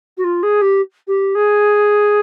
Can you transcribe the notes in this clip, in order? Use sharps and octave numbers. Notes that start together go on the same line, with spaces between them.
F#4
F4
G#4
G4
G4
G#4